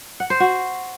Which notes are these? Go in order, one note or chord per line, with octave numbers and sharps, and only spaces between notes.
F#5
C5
F#4